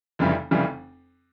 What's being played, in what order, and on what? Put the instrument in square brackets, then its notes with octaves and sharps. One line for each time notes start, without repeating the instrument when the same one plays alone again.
[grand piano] F1 F2 C#3 E3 G3
F1 F2 C#3 E3 G3